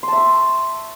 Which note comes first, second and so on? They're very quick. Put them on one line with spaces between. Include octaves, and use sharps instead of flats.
C6 A5 E5 C#6